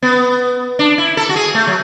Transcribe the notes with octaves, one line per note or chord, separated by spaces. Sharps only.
B3
D4
E4
A4
F#4
G#4
A3
F#3